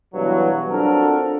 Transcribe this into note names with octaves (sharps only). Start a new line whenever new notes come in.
G2 B2 E3 F#3
C4 D4 F4 F#4 A4 A#4